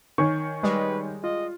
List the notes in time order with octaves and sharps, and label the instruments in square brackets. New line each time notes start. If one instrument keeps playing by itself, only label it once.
[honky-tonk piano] D#3 [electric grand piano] C#5 G#5 C#6
[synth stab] G3 G#3 [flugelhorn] B4
[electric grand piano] F4 [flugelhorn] D#5